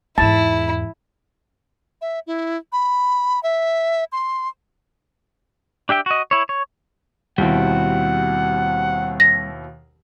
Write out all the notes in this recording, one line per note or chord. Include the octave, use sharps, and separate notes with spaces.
E2 G#2 E4 A5
E5
E4
B5
E5
C6
D4 G4 E5 G5
F#4 D#5
E4 C#5
C#5
D#2 B2 G3 C4 E4 F#5
A#6